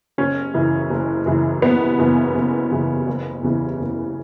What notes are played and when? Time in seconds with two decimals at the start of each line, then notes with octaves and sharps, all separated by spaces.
0.18 F#1 C#4
0.54 F#2 C#3 E3
0.90 F#1
1.26 F#2 C#3 E3
1.62 F#1 B3
1.98 F#2 C#3 E3
2.35 F#1
2.71 F#2 C#3 E3
3.06 F#1
3.43 E2 C#3 E3
3.79 F#1